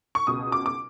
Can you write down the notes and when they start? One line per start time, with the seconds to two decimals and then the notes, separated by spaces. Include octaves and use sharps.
0.15 C#6
0.27 C#2 B2 D#6
0.52 D6
0.66 D6